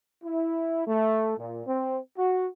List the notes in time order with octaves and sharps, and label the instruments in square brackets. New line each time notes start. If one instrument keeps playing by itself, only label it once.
[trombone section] E4
A3
A#2
C4
F#4